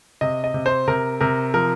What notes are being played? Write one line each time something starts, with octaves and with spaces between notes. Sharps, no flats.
C3 D#5
D#5
C3
C5
C3 A#4
C3 A#4
F3 A#4